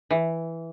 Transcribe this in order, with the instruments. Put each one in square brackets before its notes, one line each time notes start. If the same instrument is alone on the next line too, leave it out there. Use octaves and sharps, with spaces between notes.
[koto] E3